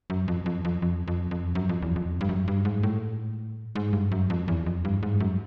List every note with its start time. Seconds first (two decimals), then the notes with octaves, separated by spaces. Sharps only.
0.10 F#2
0.28 F2
0.46 F2
0.65 F2
0.82 F2
1.08 F2
1.31 F2
1.55 F#2
1.69 F2
1.82 E2
1.96 F2
2.21 G2
2.29 F#2
2.48 G2
2.65 G#2
2.83 A2
3.75 G#2
3.93 G2
4.12 F#2
4.30 F2
4.48 E2
4.66 F2
4.85 G2
5.03 G#2
5.20 F#2